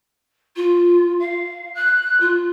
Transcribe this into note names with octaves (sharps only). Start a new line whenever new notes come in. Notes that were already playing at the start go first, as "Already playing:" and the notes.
F4
F5
F#6
F4